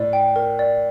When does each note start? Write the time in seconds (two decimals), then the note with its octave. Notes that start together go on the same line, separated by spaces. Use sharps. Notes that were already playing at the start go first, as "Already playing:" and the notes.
Already playing: A2 D5
0.13 G5
0.36 A#4
0.59 D5